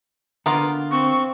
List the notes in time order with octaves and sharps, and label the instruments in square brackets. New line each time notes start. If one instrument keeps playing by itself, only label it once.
[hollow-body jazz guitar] D3 [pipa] A#3 B3 F4
[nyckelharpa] C4 [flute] C#6